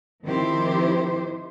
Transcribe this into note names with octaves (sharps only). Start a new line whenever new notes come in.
D#3 F3 C4 E4 G4 C5